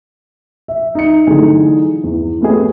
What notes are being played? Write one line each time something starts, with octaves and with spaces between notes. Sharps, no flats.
E5
D#4 E5 C#7
D3 E3 F#3 A3 D#4 G#4
E2
A3 B3 G4 G#4 C#5